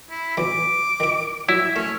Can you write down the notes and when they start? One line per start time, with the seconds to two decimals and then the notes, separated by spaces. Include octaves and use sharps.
0.10 E4
0.37 B1 E3 D6
1.00 D#3 E4
1.49 F#3 E4 E5
1.76 A3 C#4